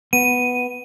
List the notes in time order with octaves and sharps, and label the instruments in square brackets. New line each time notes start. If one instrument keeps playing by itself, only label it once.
[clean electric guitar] B3 [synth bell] D#7